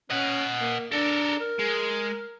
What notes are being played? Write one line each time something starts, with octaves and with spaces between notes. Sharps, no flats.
C#4 D#5 F#5
A#3
D4 A4 A#4
A#4
G#3